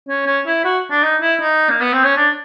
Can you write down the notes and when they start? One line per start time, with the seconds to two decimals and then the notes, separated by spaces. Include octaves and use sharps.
0.09 C#4
0.26 C#4
0.47 E4
0.65 F#4
0.91 D4
1.03 D#4
1.22 E4
1.41 D#4
1.70 A#3
1.81 B3
1.93 C4
2.04 C#4
2.17 D4